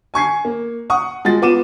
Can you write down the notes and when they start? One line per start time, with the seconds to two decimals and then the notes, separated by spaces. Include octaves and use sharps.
0.14 G#5 C#6 G#6 C7
0.45 A#3
0.90 F#5 C#6 D#6
1.25 G#3 F4 F#4 A6
1.42 B3 F4 D6 D#7 E7